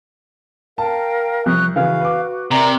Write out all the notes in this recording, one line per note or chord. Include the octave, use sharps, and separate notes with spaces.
A#4 F5 G5 A5
C2 F3 C#6 D#6 F#6
C#3 E3 F#4 F5
B4 D6
C3 A#4 D5 E5 A#5